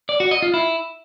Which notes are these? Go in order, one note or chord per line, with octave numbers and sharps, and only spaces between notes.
D5
F#4
D#5
F4
E4